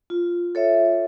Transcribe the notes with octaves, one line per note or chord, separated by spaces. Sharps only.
F4
A4 C#5 E5